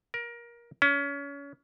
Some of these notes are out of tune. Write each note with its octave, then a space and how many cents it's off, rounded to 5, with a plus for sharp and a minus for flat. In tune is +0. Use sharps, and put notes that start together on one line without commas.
A#4 +20
C#4 +30